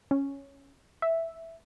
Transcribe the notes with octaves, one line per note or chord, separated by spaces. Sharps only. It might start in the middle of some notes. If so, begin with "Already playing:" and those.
C#4
E5